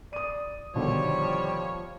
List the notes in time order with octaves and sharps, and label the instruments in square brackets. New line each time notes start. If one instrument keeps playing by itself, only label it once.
[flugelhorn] D5 [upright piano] D#6 D#7
[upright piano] B2 D3 D#3 [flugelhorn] F3 [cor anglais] G3 [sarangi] C#5